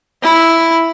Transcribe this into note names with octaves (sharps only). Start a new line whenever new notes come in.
E4